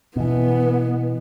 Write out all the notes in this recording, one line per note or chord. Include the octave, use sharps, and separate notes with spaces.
B2 E3 B3